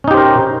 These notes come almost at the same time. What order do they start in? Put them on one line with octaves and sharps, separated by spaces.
C#4 D#4 G4 C5 A#4